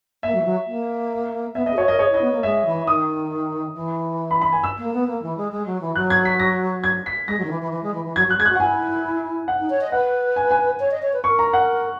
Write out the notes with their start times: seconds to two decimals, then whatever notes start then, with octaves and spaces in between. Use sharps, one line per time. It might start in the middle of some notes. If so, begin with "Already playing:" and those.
0.23 A#3 E5
0.34 F#3
0.41 E3
0.45 F#3
0.67 A#3
1.55 B3 E5
1.66 B3 D#5
1.73 G#4
1.77 F#4 C#5
1.88 A#4 D#5
1.99 G#4 C#5
2.10 E4 D#5
2.21 B3
2.32 A#3
2.43 G#3 E5
2.66 E3
2.87 D#3 D#6
3.75 E3
4.31 B5
4.41 B5
4.52 G#5
4.64 E6
4.78 A#3
4.93 B3
5.07 A#3
5.22 E3
5.37 G#3
5.52 G#3
5.66 F#3
5.81 E3
5.95 F#3 F#6
6.10 G#6
6.25 B6
6.40 A#6
6.84 G#6
7.06 B6
7.28 G#3 A#6
7.39 F#3
7.44 D#3
7.50 E3
7.61 E3
7.72 E3
7.83 G#3
7.94 E3
8.05 E3
8.16 F#3 G#6
8.27 F#3 F#6
8.38 G#3 G#6
8.46 F#4 F#6
8.55 F#5
8.60 E4 G#5
9.48 F#5
9.59 D#4
9.70 C#5
9.81 D#5
9.92 B4 F#5
10.36 G#5
10.51 G#5
10.80 C#5
10.91 D#5
11.02 C#5
11.13 B4
11.24 A#4 C#6
11.39 A#5
11.53 F#5